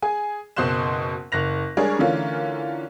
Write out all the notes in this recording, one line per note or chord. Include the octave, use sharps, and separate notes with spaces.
G#4 G#5
F#1 B2 C5 C6 F#6 E7
F#1 F#6 A#6 F7
G3 G#3 D4 G#4 A#4 C#5
D3 E3 A3 C#4 F4 A#4